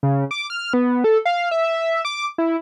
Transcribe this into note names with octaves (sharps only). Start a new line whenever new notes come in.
C#3
D6
F6
B3
A4
F5
E5
D6
E4